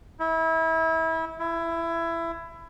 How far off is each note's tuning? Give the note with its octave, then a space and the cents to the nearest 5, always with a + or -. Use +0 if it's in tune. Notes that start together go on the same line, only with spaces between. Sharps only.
E4 -25
E4 +20